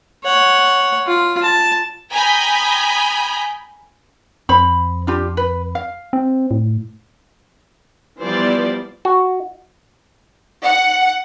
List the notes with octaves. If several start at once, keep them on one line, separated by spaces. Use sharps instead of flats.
C#5 F#5
F4
A5
G5 G#5 A#5 B5 D#6 G6
F2 C5 B5
D4 F4 G4
B4
F5
C4
A2
E3 F3 G3 B3 C5 D5
F#4
F#5